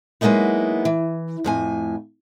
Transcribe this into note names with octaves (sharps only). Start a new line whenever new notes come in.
F#3 G#3 A#3 B3 D#4 E4
E3
F2 A2 G#5